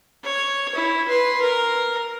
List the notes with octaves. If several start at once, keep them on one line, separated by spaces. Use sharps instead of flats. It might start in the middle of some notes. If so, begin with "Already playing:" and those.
C#5
E4
B4 C6
A#4